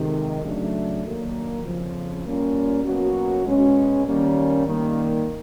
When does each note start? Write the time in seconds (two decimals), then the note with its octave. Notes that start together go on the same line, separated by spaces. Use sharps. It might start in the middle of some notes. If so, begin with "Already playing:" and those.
Already playing: F2 C3 D#3 G#3
0.43 C#3 F#3 A3 D4
1.04 D#3 F#3 A#3 D4
1.63 F2 C#3 F3
2.25 G3 A#3 C#4 F4
2.84 B2 F#3 A#3 C#4 F#4
3.45 B2 G#3 C#4
4.05 D#3 G3 A#3 C#4
4.66 D#3 G3 A#3